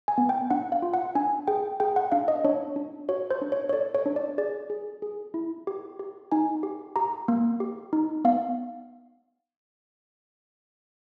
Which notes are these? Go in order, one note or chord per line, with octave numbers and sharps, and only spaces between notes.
G#5
B3
G5
D4 F#5
F5
F4
F#5
D4 G#5
G#4 G5
G#4 G5
F#5
D4 F5
D#5
D4 C#5
D4
F#4 C#5
C5
D4
C#5
C#5
A4 D5
C#5
D4
D5
G#4 D5
G#4
G#4
E4
G4
G4
D#4 G#5
G4
G4 A#5
A#3
G4
D#4
B3 F5